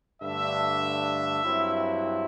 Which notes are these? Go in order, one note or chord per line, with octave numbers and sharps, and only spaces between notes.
G2 D3 A3 D4 E5
G2 F#3 C4 E4